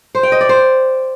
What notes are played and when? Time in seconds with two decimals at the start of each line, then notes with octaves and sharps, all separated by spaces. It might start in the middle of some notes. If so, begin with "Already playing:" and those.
0.15 C5
0.23 G5
0.32 D#5
0.41 D5
0.49 C5